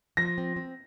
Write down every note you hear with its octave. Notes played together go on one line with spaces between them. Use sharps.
F3 A#6
C4
C4